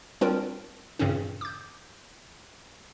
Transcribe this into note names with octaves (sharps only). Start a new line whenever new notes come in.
G3 C4 D4 F4 A#4
G2 A#2 C#3 E3 C4 C#4
D6 G6